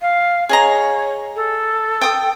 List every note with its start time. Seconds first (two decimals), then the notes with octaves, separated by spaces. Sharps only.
0.01 F5
0.49 G#4 C#5 D#5 A#5
1.36 A4
2.01 G5 D#6